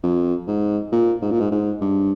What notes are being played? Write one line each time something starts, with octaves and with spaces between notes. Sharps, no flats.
F2
G#2
A#2
G#2
A#2
G#2
G#2
G2